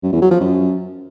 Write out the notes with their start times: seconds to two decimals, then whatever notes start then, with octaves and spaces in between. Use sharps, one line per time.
0.03 F#2
0.12 E2
0.22 F#3
0.31 F3
0.40 F#2